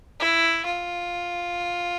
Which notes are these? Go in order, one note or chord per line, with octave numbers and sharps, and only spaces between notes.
E4
F4